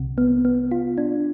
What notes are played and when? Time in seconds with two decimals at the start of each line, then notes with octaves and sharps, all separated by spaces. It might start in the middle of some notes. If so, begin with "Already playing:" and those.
Already playing: C2 C3
0.18 B3
0.45 B3
0.71 F4
0.98 D4